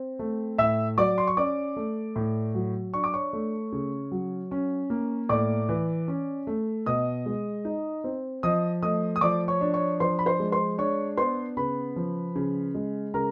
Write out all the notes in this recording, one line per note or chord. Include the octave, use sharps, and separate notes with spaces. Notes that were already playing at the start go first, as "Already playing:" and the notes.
Already playing: C4
A3
A2 E5 E6
F#3 D5 D6
C6
C#6
C#4 D5 D6
A3
A2
F#3
D4 C#6
D6
C#5 C#6
A3
C#3
F#3
C#4
A#3
A2 D5 D6
E3
C#4
A3
B2 D#5 D#6
G#3
D#4
C4
F3 D#5 D#6
A3 D#5 D#6
D#6
F3 D5 D6
C#5 C#6
D4
C#5 C#6
F3 C5 C6
B5
C5 C6
G#3
C5 C6
D4 C#5 C#6
B3 C5 C6
C#3 B4 B5
F3
C#3
G#3
C#3 A#4 A#5